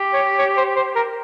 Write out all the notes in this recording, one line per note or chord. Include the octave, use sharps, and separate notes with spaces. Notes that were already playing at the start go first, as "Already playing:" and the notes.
Already playing: G4
C#5
C#5
C5
C5
A#4